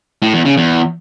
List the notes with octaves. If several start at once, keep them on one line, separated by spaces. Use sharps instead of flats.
A2
E2
C#3
E2